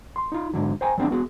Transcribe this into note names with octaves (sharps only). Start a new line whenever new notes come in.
C6
D#4 F4
G#2 B2 D3 F#3
C5 G5 G#5 A#5
F#3 B3 C4 D4 G#4
B3 F#4 G#4